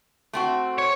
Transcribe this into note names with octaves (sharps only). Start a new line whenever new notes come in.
A3 C4 F#4
C#5